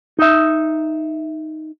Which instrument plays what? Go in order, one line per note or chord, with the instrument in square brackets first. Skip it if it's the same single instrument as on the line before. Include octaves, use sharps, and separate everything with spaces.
[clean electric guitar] D#4 E5